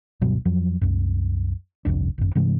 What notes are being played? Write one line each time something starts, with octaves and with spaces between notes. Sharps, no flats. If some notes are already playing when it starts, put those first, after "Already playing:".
D1 G2 B2 F#3
F2 F3 F#3
C2 F#2
G1 C2 F2 D4
G#1 F#2
G2 C3 E3 G#3